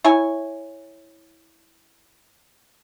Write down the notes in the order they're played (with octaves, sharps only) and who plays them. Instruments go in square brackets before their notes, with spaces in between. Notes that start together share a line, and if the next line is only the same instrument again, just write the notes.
[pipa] E4 C#5 G#5